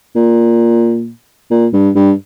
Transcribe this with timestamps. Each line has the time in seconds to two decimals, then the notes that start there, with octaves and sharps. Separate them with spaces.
0.15 A#2
1.51 A#2
1.73 G2
1.96 G2